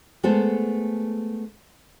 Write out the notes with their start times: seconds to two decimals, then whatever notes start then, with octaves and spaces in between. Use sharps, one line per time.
0.23 G#3 A3 B3 A4 C5